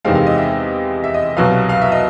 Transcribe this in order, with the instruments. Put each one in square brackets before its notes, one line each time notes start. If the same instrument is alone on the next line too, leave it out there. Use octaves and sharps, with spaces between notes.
[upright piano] E2 C3 D#3 G#3 C4 F5
F5
D#5
E5
E5
D#5
C2 B2 F#3 B3 F5
F5
E5
D#5